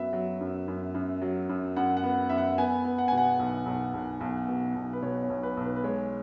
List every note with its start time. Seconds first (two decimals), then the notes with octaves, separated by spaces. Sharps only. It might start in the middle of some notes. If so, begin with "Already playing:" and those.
Already playing: F#2 F#3 B3 E5
0.13 F#3
0.41 F#2
0.68 F#2
0.94 F#2
1.22 F#3
1.49 F#2
1.77 F#2 F#5
1.97 F#5
2.04 B3
2.29 F#2 E5
2.38 F#5
2.58 B3 G#5
2.85 B3
2.98 F#5
3.08 B2 G#5
3.18 F#5
3.39 B1
3.66 B1
3.94 B1
4.21 B1
4.48 B2
4.75 B1
4.93 B4
5.02 B2 C#5
5.23 C#5
5.30 B1
5.43 B4
5.57 B1
5.64 B4
5.76 B4
5.84 G#3 C#5